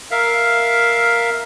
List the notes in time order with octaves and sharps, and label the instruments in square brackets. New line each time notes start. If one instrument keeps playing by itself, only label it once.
[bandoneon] A#4 E5 F5